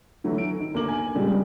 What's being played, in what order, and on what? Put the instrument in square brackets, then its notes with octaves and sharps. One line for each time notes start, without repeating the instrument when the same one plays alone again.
[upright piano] D3 E3 F#3 A3 E4
D7
D#3
D2 A#3 A#4 D6 F#7
G#5
A#2 C#3 G3 G#3 C4